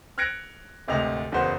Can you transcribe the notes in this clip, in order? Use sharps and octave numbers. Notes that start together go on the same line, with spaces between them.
F6 F#6 G#6 A#6 C#7 D7
G#1 D2 C3 D#5 F7
F#1 E2 B3 F#4 C5